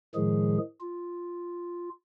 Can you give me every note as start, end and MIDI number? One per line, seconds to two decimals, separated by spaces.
0.15 0.58 45
0.15 0.58 51
0.15 0.58 53
0.15 0.58 56
0.15 0.58 68
0.81 1.89 65